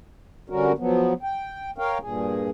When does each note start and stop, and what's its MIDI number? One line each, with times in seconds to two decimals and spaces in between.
0.50 0.72 50
0.50 0.72 55
0.50 0.72 61
0.50 0.72 66
0.50 0.72 70
0.78 1.14 53
0.78 1.14 54
0.78 1.14 59
1.23 1.71 79
1.78 1.98 70
1.78 1.98 73
1.78 1.98 77
1.78 1.98 79
2.01 2.50 43
2.01 2.50 46
2.01 2.50 68